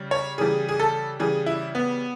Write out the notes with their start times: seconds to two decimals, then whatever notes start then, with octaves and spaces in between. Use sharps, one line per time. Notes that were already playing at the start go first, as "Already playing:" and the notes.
Already playing: C#3 G3
0.11 C#5
0.38 C#3 E3 G3 G#4
0.68 G#4
0.79 A4
1.19 C#3 E3 G3 G#4
1.46 E4
1.75 B3